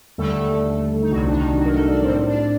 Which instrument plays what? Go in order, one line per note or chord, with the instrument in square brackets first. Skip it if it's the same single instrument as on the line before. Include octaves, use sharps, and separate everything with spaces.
[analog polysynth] D#2 D3 G3 A3 A4
D#4
C2 C3 F#3 G3 F#4
D4
D#3 D#4
F#3 F#4
A#4
A3 A4
D4 D5
A2 G3 C4 C5
D4 D5